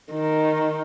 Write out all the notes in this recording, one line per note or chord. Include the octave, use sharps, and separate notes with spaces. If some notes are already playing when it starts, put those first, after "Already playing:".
D#3